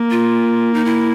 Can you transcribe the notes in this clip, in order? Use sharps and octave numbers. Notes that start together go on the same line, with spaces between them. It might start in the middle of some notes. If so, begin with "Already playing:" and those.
Already playing: A#3
F4
D#4
E4